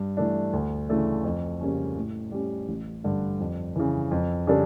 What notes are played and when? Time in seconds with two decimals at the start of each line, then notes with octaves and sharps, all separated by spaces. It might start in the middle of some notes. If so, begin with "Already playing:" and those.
Already playing: G2
0.17 E3 A3 D4
0.53 D2
0.89 C#3 E3 A3 D4
1.24 F2
1.61 C#3 G3 A#3 C#4
1.96 A2
2.32 G3 C#4
2.68 A1
3.04 G2 D3
3.40 F2
3.76 C#3 E3
4.11 F2
4.47 C#3 G3 D4 A4